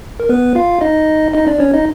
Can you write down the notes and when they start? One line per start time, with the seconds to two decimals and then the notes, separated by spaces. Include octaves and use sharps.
0.20 A#4
0.29 B3 B4
0.55 F4 F5
0.81 D#4 D#5
1.33 D#4 D#5
1.47 D4 D5
1.60 C#4 C#5
1.74 D#4 D#5